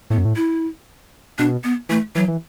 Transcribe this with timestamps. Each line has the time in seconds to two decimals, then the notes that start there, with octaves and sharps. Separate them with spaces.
0.10 A2 B3
0.18 F#2
0.25 A2
0.36 E4
1.39 B2 D4
1.64 B3
1.89 E3 A3
2.15 E3 F#3
2.28 E3